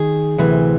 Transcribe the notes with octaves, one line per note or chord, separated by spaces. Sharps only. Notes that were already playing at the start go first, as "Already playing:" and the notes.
Already playing: D#3 G#4
D2 C3 E3